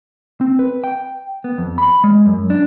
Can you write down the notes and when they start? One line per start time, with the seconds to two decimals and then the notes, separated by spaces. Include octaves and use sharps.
0.41 C4
0.59 B4
0.84 G5
1.44 B3
1.58 F2
1.78 B5
2.04 G#3
2.26 F#2
2.50 D4